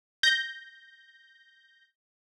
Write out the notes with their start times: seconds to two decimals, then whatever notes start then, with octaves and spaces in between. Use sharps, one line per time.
0.23 G6 A#6